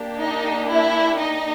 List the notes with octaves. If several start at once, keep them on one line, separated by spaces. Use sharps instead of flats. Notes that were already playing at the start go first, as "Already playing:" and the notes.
Already playing: A#3 D4 G4
D#4 D#5
E4 E5
D#4 D#5